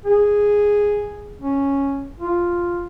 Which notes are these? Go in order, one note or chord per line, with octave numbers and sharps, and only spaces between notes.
G#4
C#4
F4